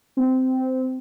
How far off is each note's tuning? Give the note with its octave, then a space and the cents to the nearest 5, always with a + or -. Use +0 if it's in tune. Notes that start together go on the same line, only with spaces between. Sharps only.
C4 -15